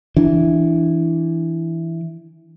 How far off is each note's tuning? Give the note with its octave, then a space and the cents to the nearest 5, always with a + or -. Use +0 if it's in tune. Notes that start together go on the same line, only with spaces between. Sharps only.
E3 +0 D4 -5